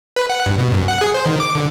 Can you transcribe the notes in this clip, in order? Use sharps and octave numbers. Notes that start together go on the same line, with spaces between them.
B4
F#5
G2
B2
F#2
F#5
G#4
C5
D#3
D6
D3